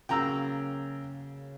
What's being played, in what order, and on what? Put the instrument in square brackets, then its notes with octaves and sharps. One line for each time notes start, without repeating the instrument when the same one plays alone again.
[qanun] C#3 F#3 A#3 [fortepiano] G5 A#5 E6